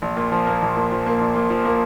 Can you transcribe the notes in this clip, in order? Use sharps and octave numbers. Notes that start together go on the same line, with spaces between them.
A#1
A#2
F3
A#3
A#1
A#2
F3
A#3
A#1
A#2
F3
A#3